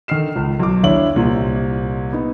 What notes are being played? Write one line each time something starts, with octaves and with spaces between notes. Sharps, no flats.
D3 D#3 D#5 F6 C7 E7
C#2
B1 D6
D#2 D4 E4 C#5 F#7
C2 A#2
B3 D#4